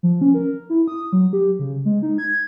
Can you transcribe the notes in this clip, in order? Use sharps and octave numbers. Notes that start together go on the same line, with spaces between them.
F3
C#4
A#4
E4
D#6
F#3
G4
C#3
G#3
D#4
G#6